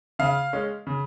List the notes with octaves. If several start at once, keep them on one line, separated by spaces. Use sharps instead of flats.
C#3 F5
G#3 C#4
C#3